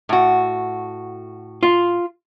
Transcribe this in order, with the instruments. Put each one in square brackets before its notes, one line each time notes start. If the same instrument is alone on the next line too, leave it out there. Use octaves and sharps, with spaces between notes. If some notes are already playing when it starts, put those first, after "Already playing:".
[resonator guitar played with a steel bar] A2 F#4
[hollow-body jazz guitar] F4